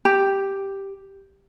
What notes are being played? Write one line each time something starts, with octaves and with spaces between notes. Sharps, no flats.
G4